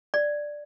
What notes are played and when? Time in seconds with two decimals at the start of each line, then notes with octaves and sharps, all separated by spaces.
0.14 D5